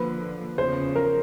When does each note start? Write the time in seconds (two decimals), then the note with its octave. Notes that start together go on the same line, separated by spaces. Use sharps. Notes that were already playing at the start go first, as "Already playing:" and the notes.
Already playing: D3 F3 A#3 B4
0.58 E2 C#3 F3 C5
0.96 A#4